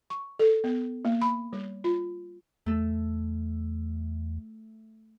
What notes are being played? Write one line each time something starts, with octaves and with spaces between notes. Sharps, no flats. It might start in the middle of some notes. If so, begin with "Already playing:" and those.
C#6
A4
B3
A#3
B5
G3
F4
E2 A3 A4